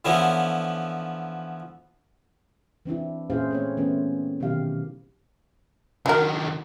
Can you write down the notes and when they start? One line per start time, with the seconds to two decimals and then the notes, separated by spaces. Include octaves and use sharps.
0.05 D3 E3 F3 B3 C#4 E4
2.85 E3 C4 D4 E4
3.30 A#2 C#4 E4 G#4 C5 F5
3.51 A3 C4 C#5
3.77 E3 A3 B3 C#4
4.40 B2 D#3 F#3 E4 G4 F5
6.06 D3 D#3 F#3 A#4